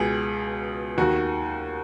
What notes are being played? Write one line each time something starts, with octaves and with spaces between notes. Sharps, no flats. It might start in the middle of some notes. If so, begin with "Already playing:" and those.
Already playing: C#2 B2 G#4
D#2 D#3 F#4